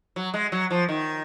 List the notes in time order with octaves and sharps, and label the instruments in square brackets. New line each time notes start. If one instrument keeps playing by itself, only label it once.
[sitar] F#3
G#3
F#3
F3
D#3